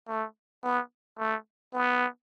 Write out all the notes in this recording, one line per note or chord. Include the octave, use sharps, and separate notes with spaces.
A3
B3
A3
B3